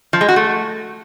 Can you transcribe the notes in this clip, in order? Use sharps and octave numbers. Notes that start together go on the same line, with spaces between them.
F3
G#3
F#4
A3